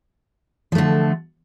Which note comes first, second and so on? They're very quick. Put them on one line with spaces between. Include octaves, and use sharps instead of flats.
F3 A3 D3